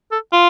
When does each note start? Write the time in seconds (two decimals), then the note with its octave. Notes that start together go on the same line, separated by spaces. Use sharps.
0.12 A4
0.33 F4